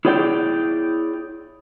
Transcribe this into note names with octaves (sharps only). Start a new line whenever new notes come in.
E4 G#4 C#5 D5 G5